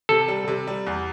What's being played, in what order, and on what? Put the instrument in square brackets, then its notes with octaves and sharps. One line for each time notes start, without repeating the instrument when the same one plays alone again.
[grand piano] C3 [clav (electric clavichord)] A4
[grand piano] G3
C3
G3
E2